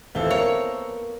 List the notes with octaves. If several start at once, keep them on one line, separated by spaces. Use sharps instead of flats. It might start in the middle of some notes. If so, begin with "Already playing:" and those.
D#1 E3 A3 C4 A4 F5 G7
A#3 B3 A#4 C#5 C#7